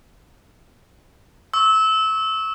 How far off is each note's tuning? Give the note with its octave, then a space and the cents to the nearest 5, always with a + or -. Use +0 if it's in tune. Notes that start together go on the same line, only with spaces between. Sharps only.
C#6 +0 E6 -25